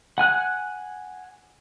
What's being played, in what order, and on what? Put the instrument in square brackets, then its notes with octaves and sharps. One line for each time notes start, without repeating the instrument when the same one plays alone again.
[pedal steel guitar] F#5 G#5 F#6